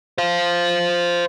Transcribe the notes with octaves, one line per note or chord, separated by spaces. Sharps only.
C5 F5